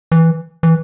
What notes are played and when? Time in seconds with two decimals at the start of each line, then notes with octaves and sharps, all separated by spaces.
0.12 E3
0.63 E3